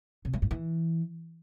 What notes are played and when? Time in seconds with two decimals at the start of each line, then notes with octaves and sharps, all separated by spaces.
0.25 C3
0.33 G3
0.42 G2
0.51 E3